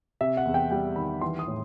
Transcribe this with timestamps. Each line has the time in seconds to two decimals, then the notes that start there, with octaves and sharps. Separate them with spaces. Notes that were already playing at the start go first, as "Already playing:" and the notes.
0.21 C3 E5
0.37 F#5
0.45 E2
0.54 G5
0.71 G3 G5
0.96 D#3 B5
1.21 E3 C6
1.39 D#6
1.47 A2